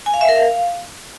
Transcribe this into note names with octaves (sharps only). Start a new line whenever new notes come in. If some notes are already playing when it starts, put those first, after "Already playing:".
G#5
F5
E5
A#4
F5